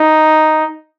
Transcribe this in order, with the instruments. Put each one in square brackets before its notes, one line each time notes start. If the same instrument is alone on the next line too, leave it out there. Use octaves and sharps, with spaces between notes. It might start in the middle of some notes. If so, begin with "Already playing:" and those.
Already playing: [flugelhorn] D#4